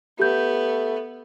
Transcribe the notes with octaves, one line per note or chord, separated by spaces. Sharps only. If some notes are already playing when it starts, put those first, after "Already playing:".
A3 B3 G4 G6